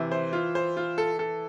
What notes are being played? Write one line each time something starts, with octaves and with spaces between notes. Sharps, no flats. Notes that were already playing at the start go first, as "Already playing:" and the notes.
Already playing: C3 E3
C5
F4
C5
F4
A4
A4